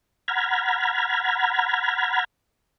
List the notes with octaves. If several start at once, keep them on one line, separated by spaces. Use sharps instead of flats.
F#5 A#5 B5 F6 G#6